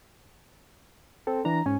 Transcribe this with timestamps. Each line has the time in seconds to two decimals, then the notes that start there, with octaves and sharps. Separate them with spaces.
1.27 C4 A4
1.45 E3 D4 A#5
1.66 G#2 C#4 G#5